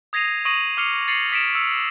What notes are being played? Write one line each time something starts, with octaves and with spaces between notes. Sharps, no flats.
D#6 G#6 A#6 C7 D#7 F7
C#6 D#6 A#6 D#7 F#7
D6 D#6 F6 C7 C#7 F7
A6 C7 C#7 D#7 F#7
D#6 B6 C#7 D7 E7
E6 C#7